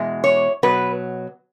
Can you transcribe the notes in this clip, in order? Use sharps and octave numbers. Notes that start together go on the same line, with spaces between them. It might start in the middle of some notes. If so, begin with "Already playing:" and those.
Already playing: E2 B2 G#3
C#5
B2 F#3 B4